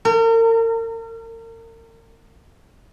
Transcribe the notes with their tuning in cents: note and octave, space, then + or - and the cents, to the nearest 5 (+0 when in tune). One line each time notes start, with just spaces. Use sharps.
A#4 -40